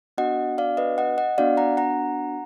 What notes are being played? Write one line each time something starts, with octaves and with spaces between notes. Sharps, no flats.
B3 D4 F#4 D#5 F#5
D5 F5
B4 D#5
D#5 F#5
D#5 F#5
B3 D4 F#4 D5 F5
F#5 A#5
F#5 A#5